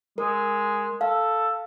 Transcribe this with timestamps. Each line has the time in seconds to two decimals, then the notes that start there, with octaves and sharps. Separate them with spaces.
0.18 G#3 A#4
1.01 A4 F5